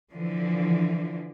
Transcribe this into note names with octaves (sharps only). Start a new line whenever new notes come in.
D3 E3 F3